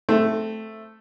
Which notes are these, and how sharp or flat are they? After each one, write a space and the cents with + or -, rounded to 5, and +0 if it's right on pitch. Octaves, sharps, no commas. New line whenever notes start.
A3 +0 C4 +0